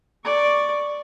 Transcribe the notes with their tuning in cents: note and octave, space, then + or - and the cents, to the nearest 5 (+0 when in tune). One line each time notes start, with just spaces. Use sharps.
D5 +0 C#6 +0